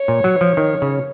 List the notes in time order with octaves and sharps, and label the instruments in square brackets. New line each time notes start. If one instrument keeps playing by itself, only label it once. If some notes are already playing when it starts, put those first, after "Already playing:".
Already playing: [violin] C#5
[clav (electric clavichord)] A#2
F#3
F3
D#3
C#3